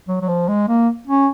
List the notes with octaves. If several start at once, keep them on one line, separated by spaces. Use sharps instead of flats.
F#3
F#3
F3
G#3
A#3
C#4